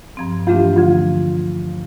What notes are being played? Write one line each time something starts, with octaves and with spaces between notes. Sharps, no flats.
G2 F3 C4
G2 E3 A3 D4 F4 G4
D2 D3 F3 F4